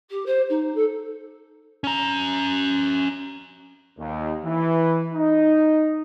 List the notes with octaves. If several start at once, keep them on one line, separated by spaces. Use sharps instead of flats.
G4
C5
D#4
A4
C#4 A#5
D#2
E3
D#4